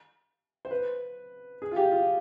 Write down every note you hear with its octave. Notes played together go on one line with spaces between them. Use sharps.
C5
B4
G#4
F4
G4
F4